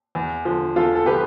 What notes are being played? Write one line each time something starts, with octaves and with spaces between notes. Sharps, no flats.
E2
D3 F3
E2 F4 A4
A4
D3 F3 G4 B4